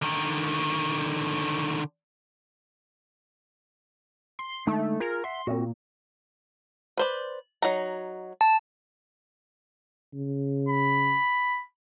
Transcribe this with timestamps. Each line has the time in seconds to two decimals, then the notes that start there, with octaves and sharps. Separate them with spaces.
0.02 D3 D#3
4.39 C6
4.67 D3 G#3 A3 D#4
5.00 F4 G#4 A#4
5.24 E5 F#5 C6
5.47 A#2 C4 F#4
6.97 B4 C5 D5
7.62 F#3 D#4 A#5
8.41 A5
10.14 C#3
10.69 B5